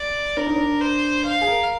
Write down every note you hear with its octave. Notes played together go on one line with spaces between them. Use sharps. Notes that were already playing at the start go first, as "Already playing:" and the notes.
Already playing: D5
D4 A#4
D#4
D4
C5
F5
G#4
A#4